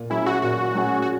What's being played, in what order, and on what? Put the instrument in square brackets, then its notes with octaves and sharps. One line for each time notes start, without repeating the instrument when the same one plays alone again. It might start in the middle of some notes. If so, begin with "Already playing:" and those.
Already playing: [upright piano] A#2
[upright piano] F#3 C#4 G#4 [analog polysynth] E4
[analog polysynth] F#4
[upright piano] A#2 [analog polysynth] F#4
[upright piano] F#3 C#4 G#4
[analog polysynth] F#4